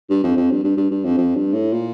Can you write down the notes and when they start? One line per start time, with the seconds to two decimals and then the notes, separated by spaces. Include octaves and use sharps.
0.10 G2
0.23 F2
0.36 F2
0.51 G2
0.64 G2
0.77 G2
0.90 G2
1.04 F2
1.17 F2
1.35 G2
1.53 A2
1.72 A#2